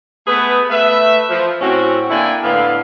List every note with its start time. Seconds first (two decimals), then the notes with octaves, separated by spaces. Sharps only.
0.27 A3 B3 G#4 B4
0.70 A3 B4 E5
1.30 F3
1.61 A2 C4 C#4 F#4
2.10 D3 A#3 E4 D5 G5 G#5
2.44 A2 D3 B3 F5